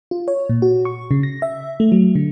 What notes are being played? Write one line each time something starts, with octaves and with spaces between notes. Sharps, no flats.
F4
C#5
A#2
F#4
C#6
C#3
A#6
E5
A3
F#3
D3